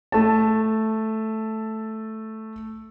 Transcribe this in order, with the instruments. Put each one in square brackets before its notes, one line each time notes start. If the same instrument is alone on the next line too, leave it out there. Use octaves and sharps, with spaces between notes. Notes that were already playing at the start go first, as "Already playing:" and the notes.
[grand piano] A3 A5